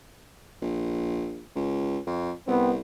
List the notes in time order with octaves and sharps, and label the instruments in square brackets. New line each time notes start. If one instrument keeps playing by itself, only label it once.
[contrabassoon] A#1
C#2
F2
[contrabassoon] C2 [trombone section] B3 C4